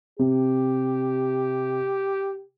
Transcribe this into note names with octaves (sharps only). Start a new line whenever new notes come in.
C3 G4